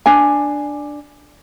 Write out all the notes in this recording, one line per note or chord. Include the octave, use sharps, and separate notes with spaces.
D4 G#5